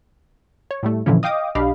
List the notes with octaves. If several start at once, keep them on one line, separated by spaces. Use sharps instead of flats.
C#5
A2 G3 A3
A#2 D3 E3 F3 C#4
D#5 F5 G5 D6 D#6
B1 D4 G4 D#5 F5 B5